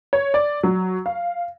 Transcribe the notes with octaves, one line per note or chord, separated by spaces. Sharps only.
C#5
D5
F#3
F5